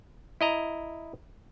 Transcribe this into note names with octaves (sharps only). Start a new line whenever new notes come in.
E4 D#5 A#5